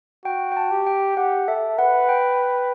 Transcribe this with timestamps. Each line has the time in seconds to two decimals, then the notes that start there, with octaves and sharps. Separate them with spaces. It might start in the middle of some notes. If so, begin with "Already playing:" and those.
0.25 F#4 G5
0.52 G5
0.57 A5
0.71 G4
0.87 G5
1.17 G4 F#5
1.48 A4 E5
1.78 B4 F#5
2.09 G5